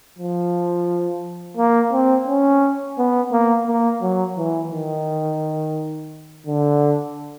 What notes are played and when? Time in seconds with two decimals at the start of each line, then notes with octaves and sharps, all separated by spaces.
0.18 F3
1.57 A#3
1.92 C4
2.27 C#4
2.98 B3
3.32 A#3
3.67 A#3
4.02 F#3
4.37 E3
4.72 D#3
6.47 D3